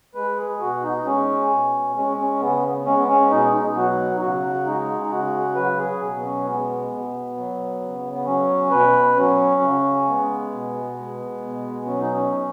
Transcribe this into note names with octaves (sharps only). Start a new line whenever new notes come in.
G#3 B4
G#4
B2 F#4
D#4
G#3 C#4
B2
G#3 C#4
C#4
C#3 B3
G#3 C#4
B3
C#4
B2 D#4
D#4
F#3 F#4
D#4
C#3 F#4
G#3 D#4
D#4
C#3 F#4
F#3 B4
G#4
B2
B3
C#4
G#3 B3
B2
F#3
C#3
B3
F#3 C#4
B2 B4
F#3 C#4
C#3
G#3 B3
B2
G#3
B2
F#3 C#4
D#4
C#4
B2